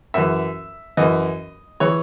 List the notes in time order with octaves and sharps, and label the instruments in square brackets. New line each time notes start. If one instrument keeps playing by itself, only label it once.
[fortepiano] F#2 E3 E5
F#2 E3 D#5
E3 C#5